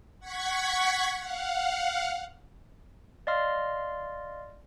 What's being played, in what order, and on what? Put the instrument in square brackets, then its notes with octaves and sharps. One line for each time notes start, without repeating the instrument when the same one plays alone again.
[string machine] F#5 C#6 G#6 B6
F5 F#5
[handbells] D5 D#5 F5 C6 F6